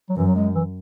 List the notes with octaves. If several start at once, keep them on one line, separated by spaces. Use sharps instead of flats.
F#3
F#2 E3
F#3
G#3
E3